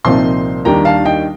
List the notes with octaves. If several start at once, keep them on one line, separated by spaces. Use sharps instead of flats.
C2 A#2 F3 C4 D#4 A5 C6
D#2 D#3 G3 D4 G5 A#5
F5 A5
D#5 G5